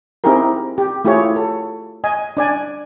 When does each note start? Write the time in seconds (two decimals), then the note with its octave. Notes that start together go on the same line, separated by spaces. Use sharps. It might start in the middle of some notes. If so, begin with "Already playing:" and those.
0.24 C4 D#4 E4 G4 G#4 A#4
0.78 G4
1.05 A3 E4 F4 G4 G#4 C#5
1.36 A4
2.04 D#5 G#5
2.37 D4 D5 G#5